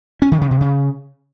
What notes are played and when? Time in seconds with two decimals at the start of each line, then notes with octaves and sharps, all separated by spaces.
0.22 C#4
0.32 D#3
0.41 C#3
0.51 C3
0.61 C#3